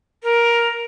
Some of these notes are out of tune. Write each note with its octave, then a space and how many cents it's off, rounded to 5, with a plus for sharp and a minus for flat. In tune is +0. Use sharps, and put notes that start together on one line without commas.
A#4 +10